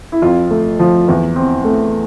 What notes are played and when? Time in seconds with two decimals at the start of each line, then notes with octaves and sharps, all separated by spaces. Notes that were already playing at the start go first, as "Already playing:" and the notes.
0.12 E4
0.22 F2 F4
0.51 A3
0.79 F3
1.08 E2
1.36 C4
1.65 A3